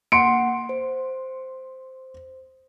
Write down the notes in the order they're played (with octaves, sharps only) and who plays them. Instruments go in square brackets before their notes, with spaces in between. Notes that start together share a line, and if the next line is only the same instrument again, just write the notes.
[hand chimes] A#3 F#5 [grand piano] C6 C#7 D7
[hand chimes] C5